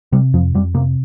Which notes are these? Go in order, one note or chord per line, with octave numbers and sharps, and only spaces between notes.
C3 G3
F2 F3
F2 G3
C3 A#3